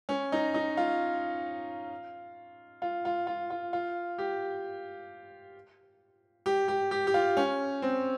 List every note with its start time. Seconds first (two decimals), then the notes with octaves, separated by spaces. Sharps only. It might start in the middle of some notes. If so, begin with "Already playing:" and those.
0.09 C#4
0.32 D#4
0.54 D#4
0.77 F4
2.82 F4
3.05 F4
3.27 F4
3.50 F4
3.73 F4
4.18 G4
6.46 G4
6.68 G4
6.91 G4
7.07 G4
7.14 F4
7.37 C#4
7.82 C4